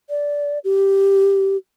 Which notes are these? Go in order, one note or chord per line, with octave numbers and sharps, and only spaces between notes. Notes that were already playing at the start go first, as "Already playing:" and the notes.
D5
G4